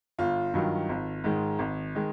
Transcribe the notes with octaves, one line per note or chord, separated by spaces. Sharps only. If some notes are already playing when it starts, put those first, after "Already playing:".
G1 F4
G2 D#3 F#3
G#1
G#2 D#3 G#3
G#1
D#3 G#3